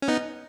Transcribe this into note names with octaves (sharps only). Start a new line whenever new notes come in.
C#4
B3 D#4